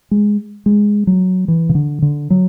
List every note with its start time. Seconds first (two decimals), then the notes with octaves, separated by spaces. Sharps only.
0.11 G#3
0.66 G#3
1.07 F#3
1.48 E3
1.69 C#3
1.75 D3
2.02 D3
2.30 F#3